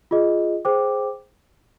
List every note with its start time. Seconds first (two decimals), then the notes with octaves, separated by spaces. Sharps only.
0.11 F4 G#4 D#5
0.65 G#4 C5 G5 D6